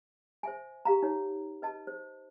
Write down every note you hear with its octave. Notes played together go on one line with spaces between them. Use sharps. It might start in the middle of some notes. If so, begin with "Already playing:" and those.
C5 E5 G#5
G4 F5 A#5
D#4 C#5
B4 D#5 A5
C5